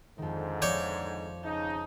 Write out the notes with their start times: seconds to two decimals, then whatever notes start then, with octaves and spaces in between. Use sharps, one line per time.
0.18 F2 G#2 D3 D#3
0.62 F3 C#5 D5 G5
1.43 C#3 D#4 A5 G6